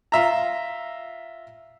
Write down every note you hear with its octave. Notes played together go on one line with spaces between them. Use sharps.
F4 E5 A#5